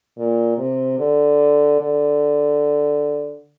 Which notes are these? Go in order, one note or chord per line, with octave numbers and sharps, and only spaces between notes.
A#2
C3
D3
D3